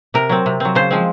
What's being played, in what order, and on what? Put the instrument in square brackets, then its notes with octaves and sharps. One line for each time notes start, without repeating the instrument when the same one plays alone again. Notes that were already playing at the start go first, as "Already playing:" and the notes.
[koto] C3 A#4
F#3 C4
C3
F#3 C4
C#3 C5
F3 G#3 C4